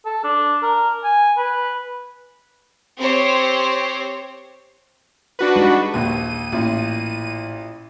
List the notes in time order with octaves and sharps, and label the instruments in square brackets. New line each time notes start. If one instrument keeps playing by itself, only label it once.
[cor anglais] A4
D4
A#4
G#5
B4
[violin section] C4 G4 C5 C#5
[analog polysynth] D4 F#4 B4
[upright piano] G3 G#3 D#4
[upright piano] A#1 D#2 [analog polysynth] D#7
[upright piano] A1 A#2 E4